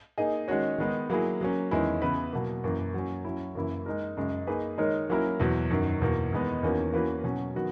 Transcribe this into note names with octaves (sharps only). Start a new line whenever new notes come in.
A#3 D#4 G#4 D#5
D#3 G#3 C#4 F#4 C#5
D#3 G#3 B3 D#4
F#3 A#3 E4 G#4
F#3 A#3 C#4
E2 D#3 G#3 C#4 E4
C#3 E3 B3 E4 B4
B2 F#3 A#3
F#2 E3 A#3
F#3 A#3 C#4
F#3 C#4 E4
F#2 C#3 E3 A#3 E4
G#3 D#4 A#4
F#2 C#3 G#3
A#3 D#4 G#4 B4
D#3 G#3 D#4 A#4 C#5
F#3 A#3 C#4 E4 A#4
E2 B2 F#3
F#2 D#3 F#3
E2 B2 A#3
E2 D#3 G#3 B3 D#4
E2 D#3 A#3 C#4 F#4
E3 A#3 C#4 F#4 B4
B2 F#3 C#4
D#3 F#3 B3 F#4